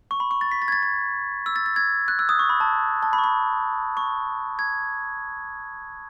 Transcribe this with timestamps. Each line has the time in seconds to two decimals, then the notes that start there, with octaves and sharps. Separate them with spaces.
0.11 C#6
0.20 B5
0.31 C#6
0.41 A6
0.51 B6
0.62 A6
0.68 G#6
0.72 A6
0.83 G#6
1.46 E6
1.56 A6
1.66 A6
1.76 G#6
2.08 F#6
2.19 E6
2.29 D#6
2.39 C#6
2.50 B5
2.60 A5
3.03 A5
3.13 B5
3.18 C#6
3.24 B5
3.97 C#6
4.59 G#6